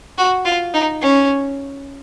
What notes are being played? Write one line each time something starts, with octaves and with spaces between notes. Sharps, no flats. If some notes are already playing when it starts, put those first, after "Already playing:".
F#4
F4
D#4
C#4